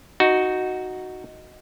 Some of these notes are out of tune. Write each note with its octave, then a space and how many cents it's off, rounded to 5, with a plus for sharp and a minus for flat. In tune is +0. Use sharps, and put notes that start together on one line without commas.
D#4 +0 F#4 +0